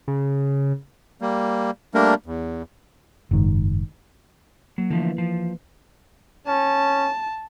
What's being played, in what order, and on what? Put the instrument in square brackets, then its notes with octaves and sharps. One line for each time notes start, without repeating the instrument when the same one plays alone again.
[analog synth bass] C#3
[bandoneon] G3 A#3
G3 A3 A#3 D4 A#4
E2
[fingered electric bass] F#1 G#2 D#3
[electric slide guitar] F#3 [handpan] A#3
[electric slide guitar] D3 F3 A3 [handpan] E3
[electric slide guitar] F3
[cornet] C#4 [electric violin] A5